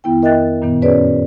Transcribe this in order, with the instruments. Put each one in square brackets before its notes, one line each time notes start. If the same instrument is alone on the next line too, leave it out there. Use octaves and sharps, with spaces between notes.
[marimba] F2 D#3 B3 E4 G5
A#4 D#5 E5 G5 F#6 A6
F#2 A#2 D#3 B3
C#4 F#4 G#4 B4 C#5 D5